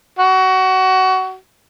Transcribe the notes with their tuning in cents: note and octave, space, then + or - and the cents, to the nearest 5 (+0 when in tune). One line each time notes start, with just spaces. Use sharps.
F#4 +25